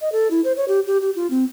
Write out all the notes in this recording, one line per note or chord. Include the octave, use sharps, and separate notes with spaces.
D#5
A4
E4
C5
C#5
G4
G4
G4
F4
C4